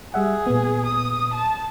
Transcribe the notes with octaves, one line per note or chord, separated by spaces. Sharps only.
G3 G#4 E5 F#5
A#2 B3
D#6
A5